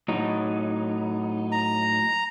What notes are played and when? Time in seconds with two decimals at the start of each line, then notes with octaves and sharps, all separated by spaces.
0.08 A2 F#3 D#4
1.52 A#5